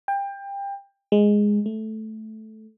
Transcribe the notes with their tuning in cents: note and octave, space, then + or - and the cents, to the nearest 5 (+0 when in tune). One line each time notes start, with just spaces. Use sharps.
G5 +25
G#3 -5
A3 -10